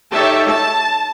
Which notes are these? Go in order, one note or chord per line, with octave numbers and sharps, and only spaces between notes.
D#4 G4 A4 C#5 E5 A5
A5